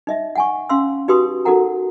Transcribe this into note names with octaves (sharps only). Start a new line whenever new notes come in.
D#4 D#5 E5
F#5 G#5 C#6
C#4 F5 C6 E6
D#4 F#4 G4 B4 C6 D#6
D#4 F#4 A4 A#4 F#5 A#5